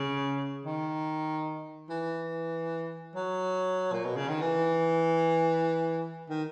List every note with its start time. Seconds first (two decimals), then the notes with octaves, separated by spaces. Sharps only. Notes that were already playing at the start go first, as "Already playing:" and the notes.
Already playing: C#3
0.65 D#3
1.90 E3
3.15 F#3
3.92 A#2
4.05 B2
4.17 C#3
4.29 D#3
4.41 E3
6.29 D#3